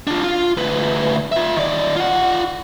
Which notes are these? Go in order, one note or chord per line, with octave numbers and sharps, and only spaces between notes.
D4 F4
F4
D2 B4
F4 E5
D#3 D5
F4 F#5